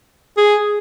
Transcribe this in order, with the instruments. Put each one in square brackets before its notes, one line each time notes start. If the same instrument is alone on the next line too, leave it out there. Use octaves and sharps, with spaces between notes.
[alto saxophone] G#4